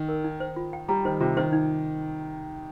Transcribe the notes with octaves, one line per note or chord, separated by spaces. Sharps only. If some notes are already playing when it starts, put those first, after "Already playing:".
Already playing: D#3
A#4
D#4
C5
F4
G5
G3 A#5
D#3 C5
C3 F4
D#3 C5
D#4